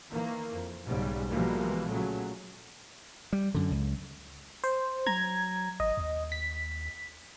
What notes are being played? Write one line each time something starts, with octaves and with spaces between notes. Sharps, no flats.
D#3 E3 A#3
F2
B1 G#2 C#3 G3
B2 E3 F3 G3 G#3 A#3
A#2 C#3 F#3 A3
G3
F#2 D3
C#2
C5
F#3 A#5 G#6
G#1 D#5
D#2
B6